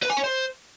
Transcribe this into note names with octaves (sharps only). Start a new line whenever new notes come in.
B4
G#5
C#5
C5